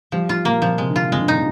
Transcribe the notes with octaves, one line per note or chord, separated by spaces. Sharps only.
F3 G3
F4
A#2 A#3
A#2 F3
C3 G#3
D3
F4
F2 G#3
G2
A#2 D#4